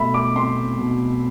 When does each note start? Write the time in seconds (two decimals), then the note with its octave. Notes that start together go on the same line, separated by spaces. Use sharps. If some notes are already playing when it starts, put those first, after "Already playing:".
Already playing: B2 A3 E5 B5
0.14 D6
0.36 C4 C6
0.78 B2